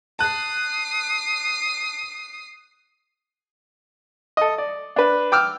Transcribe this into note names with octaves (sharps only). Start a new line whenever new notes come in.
A5 D#6 F#6 C7
A4 D#5
D5
D4 B4
G5 D6 E6 F6